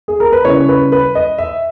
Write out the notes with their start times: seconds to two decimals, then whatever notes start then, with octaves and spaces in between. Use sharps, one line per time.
0.08 G#4
0.20 A#4
0.32 B4
0.45 C#3 G3 C#4 E4 C#5
0.68 B4
0.92 B4
1.15 D#5
1.38 E5